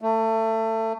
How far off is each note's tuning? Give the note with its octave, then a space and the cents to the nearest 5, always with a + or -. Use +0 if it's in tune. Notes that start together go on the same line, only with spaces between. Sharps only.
A3 +25